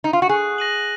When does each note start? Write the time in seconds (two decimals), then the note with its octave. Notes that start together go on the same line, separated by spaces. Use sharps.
0.04 D#4
0.13 F4
0.22 F#4
0.29 G#4 F#6
0.58 A#6 D#7 F#7